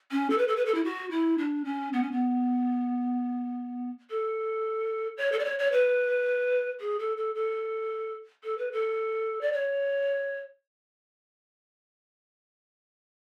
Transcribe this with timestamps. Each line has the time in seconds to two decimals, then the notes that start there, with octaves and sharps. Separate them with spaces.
0.12 C#4
0.30 A4
0.38 B4
0.48 A4
0.56 B4
0.66 A4
0.75 E4
0.84 F#4
1.11 E4
1.38 D4
1.65 C#4
1.93 B3
2.03 C#4
2.12 B3
4.10 A4
5.18 C#5
5.32 A4
5.39 D5
5.45 C#5
5.59 C#5
5.72 B4
6.80 G#4
6.99 A4
7.17 A4
7.35 A4
8.44 A4
8.58 B4
8.72 A4
9.41 D5
9.53 C#5